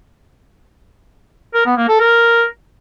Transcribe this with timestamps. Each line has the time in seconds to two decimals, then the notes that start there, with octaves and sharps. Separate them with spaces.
1.54 A#4
1.66 B3
1.77 A#3
1.89 A4
2.00 A#4